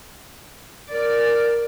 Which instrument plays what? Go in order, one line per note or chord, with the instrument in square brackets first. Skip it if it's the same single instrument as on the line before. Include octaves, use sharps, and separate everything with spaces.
[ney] A#4 [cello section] D5